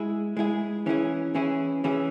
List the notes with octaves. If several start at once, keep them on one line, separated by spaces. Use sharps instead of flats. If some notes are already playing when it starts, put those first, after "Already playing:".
Already playing: G#3 E4 G#4
G#3 E4 G#4
E3 C#4 E4 G#4
E3 C#4 E4 G#4
E3 C#4 E4 G#4